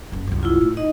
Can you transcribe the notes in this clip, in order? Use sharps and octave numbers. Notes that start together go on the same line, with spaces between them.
F#1 F#2
C2 F#2
E4 F4
A2
D#4 D#5